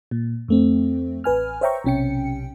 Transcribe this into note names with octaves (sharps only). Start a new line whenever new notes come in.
A#2
F2 A3 C4
A1 B4 G#5 F6
C5 C#5 E5 G5 A#5 C#6
B1 C3 C#4 G5 C#7